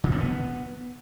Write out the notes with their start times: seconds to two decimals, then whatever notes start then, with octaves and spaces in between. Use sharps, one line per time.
0.04 C#3
0.12 B2
0.20 B3